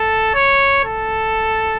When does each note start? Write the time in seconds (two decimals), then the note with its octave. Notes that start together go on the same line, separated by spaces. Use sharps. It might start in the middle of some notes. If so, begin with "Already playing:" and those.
Already playing: A4
0.35 C#5
0.85 A4